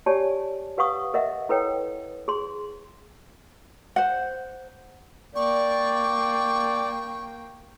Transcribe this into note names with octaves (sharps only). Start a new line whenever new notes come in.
G4 C#5 D5 G#5 A5
G4 B4 F5 F#5 C#6 D#6
A#4 D#5 E5 F#5
E4 A4 B4 C#5 G5
G#4 C6
C5 F#5
A#3 D5 G5 C#6